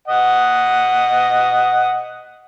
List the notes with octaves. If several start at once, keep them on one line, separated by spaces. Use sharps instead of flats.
D#5 F#5